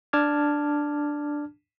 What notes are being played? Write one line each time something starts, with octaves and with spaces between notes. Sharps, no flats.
D4 A5 D6 F6 G#6